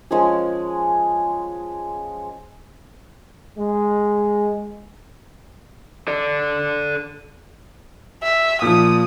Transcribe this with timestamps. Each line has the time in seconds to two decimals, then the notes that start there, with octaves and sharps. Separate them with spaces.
0.11 F3 G#3 C#4 G#4
3.58 G#3
6.08 A4 D5
8.23 E5
8.62 A#2 F3 D#6